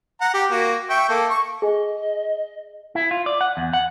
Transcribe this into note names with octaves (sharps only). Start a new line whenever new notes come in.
F#5 A#5
G4
A#3 F#4
E5 G5 C#6
A#3 A4
C#6
G#4 D#5 G#5
E4
F4
D5
F#5
E2
F#5